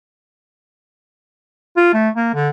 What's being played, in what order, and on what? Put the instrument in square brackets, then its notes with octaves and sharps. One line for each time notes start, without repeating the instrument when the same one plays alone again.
[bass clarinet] F4
A3
A#3
D3